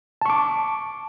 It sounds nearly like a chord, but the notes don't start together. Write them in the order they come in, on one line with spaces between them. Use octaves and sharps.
A5 C#6 D6